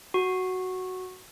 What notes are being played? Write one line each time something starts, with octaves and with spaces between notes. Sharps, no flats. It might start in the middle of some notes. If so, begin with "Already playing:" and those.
F#4